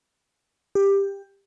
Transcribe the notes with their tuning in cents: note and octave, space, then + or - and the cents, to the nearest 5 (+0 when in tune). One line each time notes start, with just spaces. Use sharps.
G4 +15